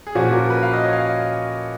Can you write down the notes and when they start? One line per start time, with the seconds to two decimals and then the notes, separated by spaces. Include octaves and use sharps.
0.07 G#4
0.15 A#2 F3 A#3 C#4 F#4
0.33 A#4
0.50 B4
0.63 F5
0.73 D#5
0.84 C#5
0.93 F5